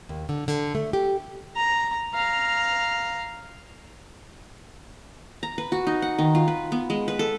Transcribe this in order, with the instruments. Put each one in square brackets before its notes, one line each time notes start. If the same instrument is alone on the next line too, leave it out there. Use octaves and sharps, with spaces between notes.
[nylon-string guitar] D#2
D3
D3
A3
G4
[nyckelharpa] A#5
F5 A#5
[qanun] A#5
B4
F#4
D#4
F#5
D#3
F4
B4
B3
G#3
B4
A4